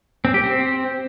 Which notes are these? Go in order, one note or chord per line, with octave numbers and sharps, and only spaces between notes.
C4
G4
C4